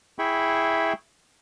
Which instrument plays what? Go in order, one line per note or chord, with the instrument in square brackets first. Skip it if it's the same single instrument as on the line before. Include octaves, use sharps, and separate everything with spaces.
[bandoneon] E4 G#4 E5 G5 B5 C#6